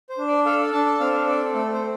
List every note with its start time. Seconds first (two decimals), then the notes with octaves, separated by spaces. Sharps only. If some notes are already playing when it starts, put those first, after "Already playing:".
0.09 C5
0.18 D4
0.27 D5
0.45 A4 F5
0.59 D5
0.73 D4 A5
0.86 A5
1.00 C4 F5
1.13 F5
1.27 A4 D5
1.54 A3 A4
1.73 C5
1.81 C4